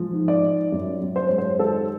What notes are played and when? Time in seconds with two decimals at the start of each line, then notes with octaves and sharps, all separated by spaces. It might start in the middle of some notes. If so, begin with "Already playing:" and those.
Already playing: F3 G#3
0.13 G#2
0.28 D5
0.43 G#2
0.72 F#2
1.01 F#2
1.16 C5
1.27 G#3 C#5
1.38 C5
1.59 D#3 A4